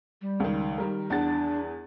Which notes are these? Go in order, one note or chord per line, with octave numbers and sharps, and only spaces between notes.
G3
C#2 D#3
D#3 G3 A#4
E2 D4 F#5 A6